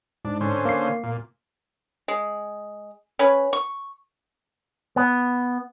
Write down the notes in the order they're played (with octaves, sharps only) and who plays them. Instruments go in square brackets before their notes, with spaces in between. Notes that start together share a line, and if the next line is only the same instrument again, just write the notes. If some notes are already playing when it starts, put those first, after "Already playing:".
[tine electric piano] G#2 [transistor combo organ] D4
[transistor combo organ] D3 C#4 C5
[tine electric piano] A#3 C7
[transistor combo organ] A#2
[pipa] G#3
C#4 B4
C#6
[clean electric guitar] B3